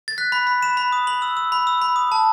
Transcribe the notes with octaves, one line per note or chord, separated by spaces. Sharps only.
A6
F#6 B6
B5
B5
B5 E7
B5
D#6
B5 F#7
E6
E6
B5
E6
B5
D#6
A5